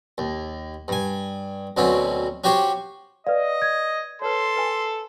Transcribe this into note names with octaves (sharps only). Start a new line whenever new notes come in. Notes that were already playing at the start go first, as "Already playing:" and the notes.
D#2
G2 G#5
D2 B2 F#3 C4 C#4
C#4 F#4 G4 C5 C#5
B4 D5 D#5 F5
G#6
A4 B4 C#5 C6
B4 G#5